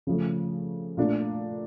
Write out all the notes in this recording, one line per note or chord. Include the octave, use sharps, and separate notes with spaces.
C#3 F3 A3
A#2 A3 D4